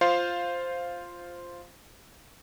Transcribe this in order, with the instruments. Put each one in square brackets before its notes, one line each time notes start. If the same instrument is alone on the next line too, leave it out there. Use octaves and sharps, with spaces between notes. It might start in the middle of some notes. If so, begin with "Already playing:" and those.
[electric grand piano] F4 C5 F5 C6